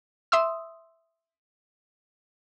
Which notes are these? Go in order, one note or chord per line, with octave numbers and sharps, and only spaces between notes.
E5 C6 D#6 E6